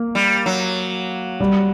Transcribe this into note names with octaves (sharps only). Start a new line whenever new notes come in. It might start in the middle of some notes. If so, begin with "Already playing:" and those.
Already playing: A#3
G3
F#3
G3